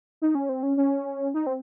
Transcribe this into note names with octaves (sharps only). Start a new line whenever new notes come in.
D#4
C#4
C4
C#4
C#4
D#4
C4